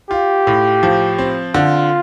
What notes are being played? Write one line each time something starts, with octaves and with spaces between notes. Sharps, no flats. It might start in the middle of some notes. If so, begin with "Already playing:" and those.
F4 G4
A2
F3
C4
D3 F4